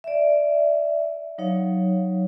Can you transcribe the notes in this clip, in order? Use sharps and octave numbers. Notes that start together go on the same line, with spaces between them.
D5 E5
F#3 D#4 C#5 F5